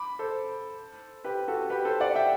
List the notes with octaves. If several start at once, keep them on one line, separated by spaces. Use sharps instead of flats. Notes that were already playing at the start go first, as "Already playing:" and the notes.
Already playing: B5 D6
A4 C5
G4 B4
F#4 A4
G4 B4
A4 C5
D5 F#5
E5 G5